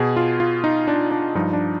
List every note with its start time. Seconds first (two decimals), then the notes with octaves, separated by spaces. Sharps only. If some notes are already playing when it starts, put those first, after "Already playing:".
Already playing: B2 G#4
0.16 F4
0.40 F4
0.64 D#4
0.88 D4
1.11 D4
1.35 G2 F3 D#4
1.53 D4